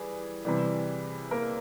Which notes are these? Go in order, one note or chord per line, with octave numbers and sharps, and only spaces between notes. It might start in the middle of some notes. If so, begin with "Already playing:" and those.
Already playing: E3 G3 G#4
C3 E3 G3
A#3 A#4